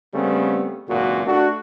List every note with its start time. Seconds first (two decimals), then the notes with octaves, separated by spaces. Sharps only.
0.14 C#3 G3 A3 B3 C4
0.87 G#1 C#2 F#2 A#2 F#4
1.26 A3 D4 F#4